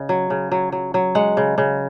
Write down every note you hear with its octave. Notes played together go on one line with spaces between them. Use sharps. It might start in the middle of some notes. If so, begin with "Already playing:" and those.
Already playing: C#3 D#5
F#3
C#3
F#3
F#3
F#3
G#3 F#5
C#3
C#3